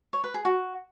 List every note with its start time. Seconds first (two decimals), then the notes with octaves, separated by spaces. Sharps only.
0.13 C#5
0.24 B4
0.34 G#4
0.45 F#4